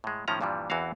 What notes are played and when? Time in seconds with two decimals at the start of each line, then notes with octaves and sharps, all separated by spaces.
0.04 A2 G#3
0.28 A2 D#3 F3 C#4 A#5
0.41 G2 A#2 E3 F3 G3
0.70 E2 E3 C4 F#4 F5